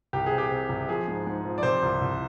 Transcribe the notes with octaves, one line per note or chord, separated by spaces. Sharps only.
C2 G4
G#4
C3
G4
C3
C2
F3 G#4
G#2
G#2
F3
D5
C3 C5
C2
C2